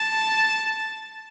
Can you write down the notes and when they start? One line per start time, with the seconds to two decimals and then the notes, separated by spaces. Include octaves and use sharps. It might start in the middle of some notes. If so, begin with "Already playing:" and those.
Already playing: A5